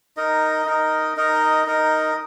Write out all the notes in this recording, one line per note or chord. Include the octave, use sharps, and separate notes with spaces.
D#4 A#4 D#5
D#4 A#4 D#5
D#4 A#4 D#5
D#4 A#4 D#5